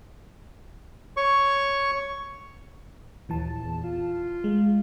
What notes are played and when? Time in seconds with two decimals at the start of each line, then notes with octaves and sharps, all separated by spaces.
1.17 C#5 C#6
3.29 D#2 A#2 E3 A5
3.61 E2
3.83 F4
4.44 G#3